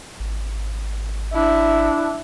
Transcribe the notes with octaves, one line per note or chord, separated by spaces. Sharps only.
G#1
D4 E4